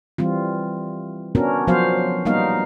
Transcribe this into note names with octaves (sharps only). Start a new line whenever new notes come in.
E3 G3 C4 F4
B3 C#4 D4 F#4 A#4
F3 F#3 B3 F#4 C5 F5
G3 A#3 B3 D#4 A#4 F5